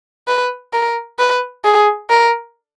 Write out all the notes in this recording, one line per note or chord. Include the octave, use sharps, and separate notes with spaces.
B4
A#4
B4
G#4
A#4